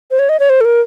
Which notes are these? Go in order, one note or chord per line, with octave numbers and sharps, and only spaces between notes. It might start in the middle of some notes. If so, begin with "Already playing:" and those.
C5
C#5
D#5
C#5
C5
A4
A#4